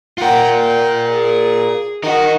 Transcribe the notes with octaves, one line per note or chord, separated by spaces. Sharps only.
F4 A#4 F#5 G5
G5
G#4
D#4 F#4 A#4